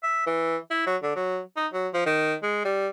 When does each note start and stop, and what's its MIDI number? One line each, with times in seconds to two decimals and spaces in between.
0.03 0.23 76
0.26 0.57 52
0.70 0.86 64
0.86 0.96 54
1.03 1.12 50
1.16 1.40 54
1.57 1.67 63
1.73 1.88 54
1.94 2.02 53
2.06 2.35 51
2.43 2.60 56
2.65 2.88 55